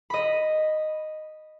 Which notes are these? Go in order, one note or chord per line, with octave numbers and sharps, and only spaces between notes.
D#5 B5